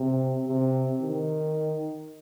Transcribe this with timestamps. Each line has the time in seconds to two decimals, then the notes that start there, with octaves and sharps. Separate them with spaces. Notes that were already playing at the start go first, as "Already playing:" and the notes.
Already playing: C3
0.47 C3
1.01 D#3